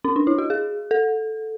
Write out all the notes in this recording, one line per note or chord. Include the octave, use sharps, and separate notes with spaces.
C#4
D4
E4
F#4
G#4
A4